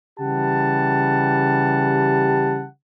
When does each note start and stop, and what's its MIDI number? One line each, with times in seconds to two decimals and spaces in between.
0.20 2.65 49
0.20 2.65 52
0.20 2.65 55
0.20 2.65 67
0.20 2.65 78
0.20 2.65 81